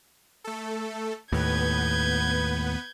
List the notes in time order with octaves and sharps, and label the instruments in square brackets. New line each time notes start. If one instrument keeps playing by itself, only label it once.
[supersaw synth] A3 A4
[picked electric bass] D#2 A2 [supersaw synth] B3 B4 [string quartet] G6 G#6